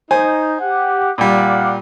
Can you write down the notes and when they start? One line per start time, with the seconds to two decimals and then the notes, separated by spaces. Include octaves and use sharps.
0.11 D#4 C5 G#5
0.61 G4 F#5
1.18 A#2 G3 F5 F#5 D6